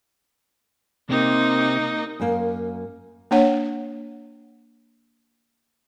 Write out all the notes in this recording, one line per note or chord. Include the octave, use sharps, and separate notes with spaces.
C3 A#3 C4 D#4
F#2 A#3
A#3 D4 C#5 F#5